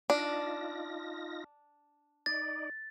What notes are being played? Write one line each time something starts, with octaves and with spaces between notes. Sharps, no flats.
D4 D#4 F4 A#6
D#4 D5 A6